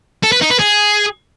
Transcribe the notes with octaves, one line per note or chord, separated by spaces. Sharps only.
A4
B4
D#4
B4
G#4